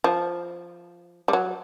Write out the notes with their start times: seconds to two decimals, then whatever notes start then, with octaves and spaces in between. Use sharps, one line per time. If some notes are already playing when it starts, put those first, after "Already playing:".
0.04 F3
1.28 G3
1.33 F#3